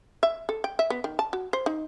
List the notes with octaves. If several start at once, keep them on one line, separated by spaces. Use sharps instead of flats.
E5
A4
G5
E5
B3
D#3
A5
F#4
C5
D#4